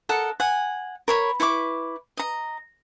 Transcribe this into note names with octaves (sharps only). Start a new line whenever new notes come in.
A4 A#4 D#5 F#5
F#5 G#5
A#4 C#5 B5
E4 B4 C#6 D6
D#5 A#5